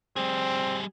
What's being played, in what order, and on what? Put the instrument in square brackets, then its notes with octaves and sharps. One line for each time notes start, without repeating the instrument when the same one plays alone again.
[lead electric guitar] G3 G#4 [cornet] C4